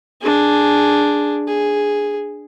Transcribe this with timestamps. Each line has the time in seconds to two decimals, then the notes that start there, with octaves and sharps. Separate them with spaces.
0.21 D4 G#4
1.48 G#4